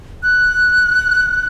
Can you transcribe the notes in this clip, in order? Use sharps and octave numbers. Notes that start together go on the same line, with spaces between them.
F#6